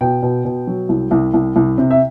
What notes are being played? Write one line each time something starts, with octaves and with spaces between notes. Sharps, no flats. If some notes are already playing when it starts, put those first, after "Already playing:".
B2 G5
B2
B2
F#3
C2
C2
C2
C2
C3
E5